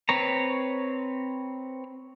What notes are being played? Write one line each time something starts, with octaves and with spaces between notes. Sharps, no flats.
C4 B4 C#5 A#5